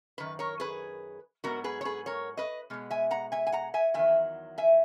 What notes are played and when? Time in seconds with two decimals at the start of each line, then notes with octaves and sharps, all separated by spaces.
0.18 F#2 D#3 B4
0.39 A#4 C#5
0.60 G#4 B4
1.44 G#2 F#3 B3 F#4 A#4
1.64 G#4 B4
1.81 C#5
1.85 G#4 B4
2.06 A#4 C#5
2.37 B4 D#5
2.70 B2 G#3 B3
2.90 E5 G#5
3.11 F#5 A#5
3.32 E5 G#5
3.47 G#5
3.52 F#5 A#5
3.74 E5 G#5
3.94 E2 D#3 F#3 E5 G#5
4.58 E5 G#5